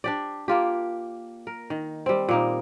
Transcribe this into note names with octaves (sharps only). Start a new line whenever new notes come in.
D4 G4 D5
A#3 F4 G4
A#4
D#3
G3 C4
A#2 A#3 D#4